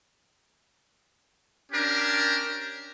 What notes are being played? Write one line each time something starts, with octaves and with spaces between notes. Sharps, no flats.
C#4 D4 G4 A#4